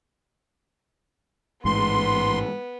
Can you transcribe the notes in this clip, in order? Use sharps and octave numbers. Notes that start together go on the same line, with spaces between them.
A1 G#2 B3 C6